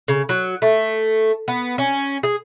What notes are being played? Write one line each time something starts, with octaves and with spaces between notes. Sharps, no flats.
C#3
F#3
A3
B3
C#4
G#4